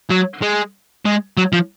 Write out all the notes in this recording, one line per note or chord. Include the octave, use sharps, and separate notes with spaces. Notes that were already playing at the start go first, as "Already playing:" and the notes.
F#3
G#3
G#3
F#3
F3